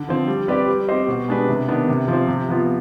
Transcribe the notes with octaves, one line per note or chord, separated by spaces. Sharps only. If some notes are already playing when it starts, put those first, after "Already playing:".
Already playing: D3
F3 C4
G3
C4 G4 B4 D5
G3
C4 G4 C5 D#5
B2
G#3 D4 G4 B4
C3
D#3 B3 D4
C3
F3
C4
C3
F3 B3 F4